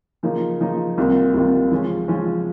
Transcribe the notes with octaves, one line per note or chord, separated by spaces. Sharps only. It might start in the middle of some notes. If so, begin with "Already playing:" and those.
C#3 F3 A#3 D#4
C#3 F3 A#3 D#4
C2 C3 D#3 A#3 F4
C2 C3 D#3 A#3 F4
C#3 F3 G#3 C#4
C#3 F3 G#3 C#4